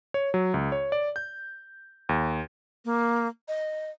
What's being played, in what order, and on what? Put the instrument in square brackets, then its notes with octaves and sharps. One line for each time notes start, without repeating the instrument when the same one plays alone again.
[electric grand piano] C#5
F#3
C#2
C#5
D5
G6
D#2
[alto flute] A#3
D#5